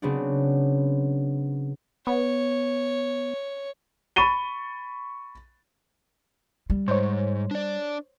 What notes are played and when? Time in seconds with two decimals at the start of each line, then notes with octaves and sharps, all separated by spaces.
0.02 C#3 F#3 B3 C4 D4
2.07 B3 C#5
4.16 B5 C#6 A6 D#7 G7
6.70 G3
6.88 G#2 C5 C#5
7.51 D4 D5